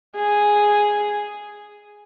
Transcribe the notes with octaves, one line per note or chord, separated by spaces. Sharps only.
G#4